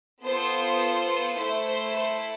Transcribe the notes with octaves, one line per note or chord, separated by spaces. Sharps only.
B3 F4 A4 C5
A3 E4 A4 C5
C5
C5